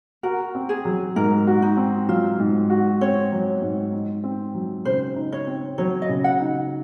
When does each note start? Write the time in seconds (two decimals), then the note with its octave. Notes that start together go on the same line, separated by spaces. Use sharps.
0.23 F#4 A#4
0.55 C4
0.69 G#4
0.85 F#3
1.16 G#2 A#4
1.47 F#4
1.62 D#4
1.77 C4
2.08 F#3 F4
2.39 G#2
2.70 F#4
3.01 C4 C#5
3.32 F#3
3.62 G#2
3.93 D#4
4.24 C4
4.54 F#3
4.85 C#3 C5
5.16 D#4
5.32 C#5
5.47 C4
5.78 F#3 C#5
6.02 D#5
6.09 C#3
6.24 F#5
6.40 D#4